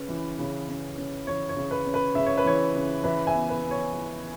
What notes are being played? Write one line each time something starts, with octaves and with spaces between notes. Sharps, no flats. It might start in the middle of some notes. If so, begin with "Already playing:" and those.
Already playing: C#3 C#4 B4
E3
C#3
C#4
C#3
E3 C#5
C#5
C#3
B4
C#4
B4
C#3 E5
C#5
B4
E3 C#5
C#3
E3 B4 E5
E5 G#5
B3
B4
B3
C#5
E3